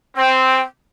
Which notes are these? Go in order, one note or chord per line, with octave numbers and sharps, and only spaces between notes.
C4 G5